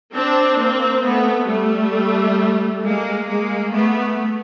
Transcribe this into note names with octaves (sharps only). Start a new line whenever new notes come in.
C4 D4
A#3 C4
A3 B3
G3 A3
G#3 A#3
G#3 A#3
A3 B3